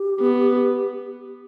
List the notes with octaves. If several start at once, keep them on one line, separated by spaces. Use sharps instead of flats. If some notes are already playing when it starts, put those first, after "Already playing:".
Already playing: G4
B3